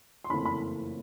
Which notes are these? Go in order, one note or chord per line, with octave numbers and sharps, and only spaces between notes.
C6
F#1 F2 C#3 E3 A3 B5
B5